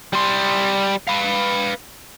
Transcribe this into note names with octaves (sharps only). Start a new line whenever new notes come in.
G3 C6
B4 F5